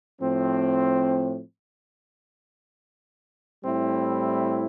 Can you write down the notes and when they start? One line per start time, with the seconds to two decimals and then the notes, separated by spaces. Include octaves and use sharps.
0.21 A2 F3 C4
3.64 A2 G3 C4 E4